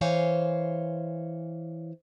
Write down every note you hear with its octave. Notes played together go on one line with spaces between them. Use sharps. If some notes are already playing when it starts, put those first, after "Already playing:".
E3 C5 C#5 F5 G#5